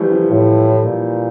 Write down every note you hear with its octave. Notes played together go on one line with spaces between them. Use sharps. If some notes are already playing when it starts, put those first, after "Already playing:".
Already playing: E3 F3 G3 A3
F3
A2 F3
A#2